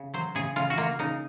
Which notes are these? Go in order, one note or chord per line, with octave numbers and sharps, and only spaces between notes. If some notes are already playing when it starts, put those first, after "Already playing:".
Already playing: C#3
F#3 C5
C#3 G#4
C#3 F4
F#4
A#3 F4
C#3 D#4